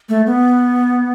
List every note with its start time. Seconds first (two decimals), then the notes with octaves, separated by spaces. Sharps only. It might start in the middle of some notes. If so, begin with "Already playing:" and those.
0.09 A3
0.26 B3